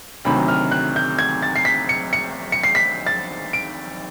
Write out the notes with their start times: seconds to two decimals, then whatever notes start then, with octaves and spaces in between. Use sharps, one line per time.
0.25 D2 C3 D#3 F#3 B5
0.48 F6
0.71 F#6
0.96 G6
1.19 G#6
1.42 A6
1.56 C7
1.65 B6
1.89 C#7
2.13 C#7
2.52 C#7
2.63 C7
2.75 B6
3.06 A6
3.53 D7